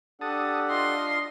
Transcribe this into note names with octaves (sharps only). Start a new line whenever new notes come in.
D4 G4 A4 F#5 A5 D#6
F4 D#5 C6